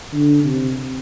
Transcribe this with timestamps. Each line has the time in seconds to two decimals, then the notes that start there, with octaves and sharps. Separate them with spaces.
0.13 D3
0.44 C3